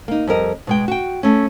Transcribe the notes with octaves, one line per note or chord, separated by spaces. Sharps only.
A#3 D#4
F2 G3 A#4 D#5
B2 G#3 G5
F#4 G5
A3 C#4